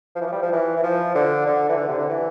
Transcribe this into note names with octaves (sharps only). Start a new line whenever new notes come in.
F3
E3
F3
G3
F3
E3
E3
F3
D3
D3
E3
D3
C3
D3
E3